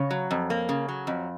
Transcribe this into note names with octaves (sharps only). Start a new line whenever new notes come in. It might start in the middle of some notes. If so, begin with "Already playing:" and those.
Already playing: C#3 C#5
F#3
F2
A#3
C#3
F#3
F2